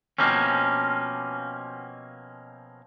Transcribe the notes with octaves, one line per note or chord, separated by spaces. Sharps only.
B2 F3 A#3 C4 C#4